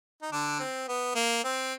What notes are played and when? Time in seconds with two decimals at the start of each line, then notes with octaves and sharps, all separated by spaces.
0.22 D#4
0.31 D3 D4
0.60 C4
0.88 B3
1.15 A#3
1.44 C4